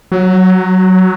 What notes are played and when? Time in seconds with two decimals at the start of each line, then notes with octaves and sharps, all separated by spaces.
0.12 F#3